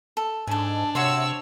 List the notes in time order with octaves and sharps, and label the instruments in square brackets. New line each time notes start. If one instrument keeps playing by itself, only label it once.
[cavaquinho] A4
[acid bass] G#2 [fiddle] D4 [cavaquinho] A4 G#5
[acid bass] C3 [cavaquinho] F#4 E5 C6 [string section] C#5 E6